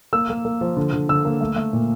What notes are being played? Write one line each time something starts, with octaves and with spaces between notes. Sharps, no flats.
A#3 E6
A#3
A#3
F3
D3
D3
D3 E6
A#3
A3
A3
A#2